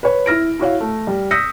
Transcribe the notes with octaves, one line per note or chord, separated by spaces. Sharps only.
B4 C#5
E4 F6 A#6 D7
E4 F#4 C#5 F5
A3
G3
D#6 E6 G6 A#6 B6 C#7